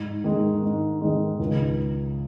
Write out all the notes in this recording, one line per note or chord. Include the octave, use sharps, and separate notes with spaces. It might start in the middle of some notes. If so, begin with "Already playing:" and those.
Already playing: G#2
D#3 G#3
G#2
D#3 G#3
C#2